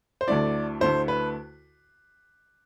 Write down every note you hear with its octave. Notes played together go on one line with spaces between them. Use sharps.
C5
D2 D3 A3 E4 D5
D2 D3 A3 E4 C5
B4